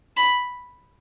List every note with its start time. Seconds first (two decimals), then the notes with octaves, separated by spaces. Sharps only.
0.17 B5